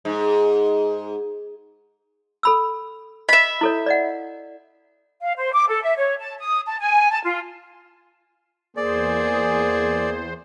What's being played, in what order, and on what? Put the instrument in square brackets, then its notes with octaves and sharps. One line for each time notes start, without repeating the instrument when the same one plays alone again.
[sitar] G#2
[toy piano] A4 B5 E6
[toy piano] D#5 [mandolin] E5 B5
[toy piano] E4 A4 C#5
D5 D#5 F#5
[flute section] F5
C5
D6
A4
E5
C#5
A5
D#6
A5
G#5
A5
F4
[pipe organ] E2 C5 [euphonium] A#3 [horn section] G#4 [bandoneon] D5